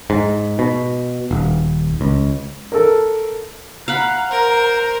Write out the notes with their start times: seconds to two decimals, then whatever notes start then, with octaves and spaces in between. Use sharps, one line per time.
0.10 G#2
0.59 B2
1.31 D#1
2.01 C#2
2.72 A4 A#4
3.88 F5 F#5 A#5 B5 F#6
4.31 A#4 C5